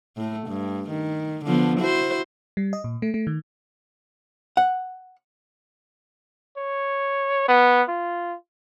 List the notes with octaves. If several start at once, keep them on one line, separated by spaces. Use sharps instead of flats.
A2 A3
G2
D#3
D3 F3 B3
E4 F#4 C5
G3
D#5
A#2
A3
A3
D#3
F#5
C#5
B3
F4